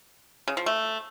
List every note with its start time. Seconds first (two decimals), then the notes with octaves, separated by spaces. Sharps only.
0.48 C#3
0.57 F3
0.66 A3